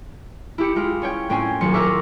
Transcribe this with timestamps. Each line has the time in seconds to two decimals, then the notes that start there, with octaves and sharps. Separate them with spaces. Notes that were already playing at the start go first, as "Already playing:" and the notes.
0.58 E4 G4 C#7
0.76 G#3 E4 F4
1.02 C#4 C#5 G5
1.29 A2 C4 C#4 G5 G#5 C7
1.61 D#1 F#3 C6 C#7
1.74 A#4 C5 E5 F#5 C#6 D6